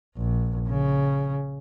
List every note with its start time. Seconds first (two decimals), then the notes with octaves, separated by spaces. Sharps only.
0.17 A#1
0.69 C#3